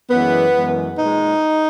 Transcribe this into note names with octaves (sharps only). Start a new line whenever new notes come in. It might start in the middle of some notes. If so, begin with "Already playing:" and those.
F#2 E3 G#3 B3
F#2 E3 G#3
A#2 G#3 D#4